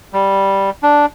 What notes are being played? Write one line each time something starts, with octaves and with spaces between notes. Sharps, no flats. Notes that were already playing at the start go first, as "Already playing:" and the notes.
G3
D4